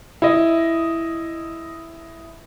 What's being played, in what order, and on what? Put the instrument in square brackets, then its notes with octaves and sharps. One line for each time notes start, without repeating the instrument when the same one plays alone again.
[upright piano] E4 D#5